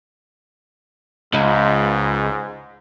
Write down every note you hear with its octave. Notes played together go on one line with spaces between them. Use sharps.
C#2 G#2